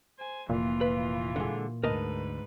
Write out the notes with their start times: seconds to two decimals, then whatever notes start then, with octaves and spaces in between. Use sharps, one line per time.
0.18 C5 G#5
0.49 F1 A#2 E3 F4
0.81 B4
1.36 D3 G#3
1.84 D2 G#2 A#4 B4 D#5 A5